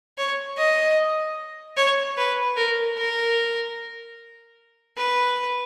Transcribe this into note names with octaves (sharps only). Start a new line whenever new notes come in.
C#5
D#5
C#5
B4
A#4
A#4
B4